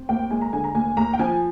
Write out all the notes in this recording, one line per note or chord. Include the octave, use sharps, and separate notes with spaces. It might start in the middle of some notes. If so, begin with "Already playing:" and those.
Already playing: C4
D#2 G5
G#3 G#5
A#5
D3 G#5
A#5
D#2 G#5
D#2 A#5
G5
F3 G#5